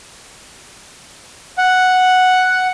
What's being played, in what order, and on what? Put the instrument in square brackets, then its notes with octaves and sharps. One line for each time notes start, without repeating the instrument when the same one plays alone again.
[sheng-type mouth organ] F#5